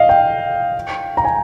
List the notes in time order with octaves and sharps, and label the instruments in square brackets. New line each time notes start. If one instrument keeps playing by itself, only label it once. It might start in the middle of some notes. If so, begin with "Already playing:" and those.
Already playing: [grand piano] D#5 F5
G5
A#5
G#5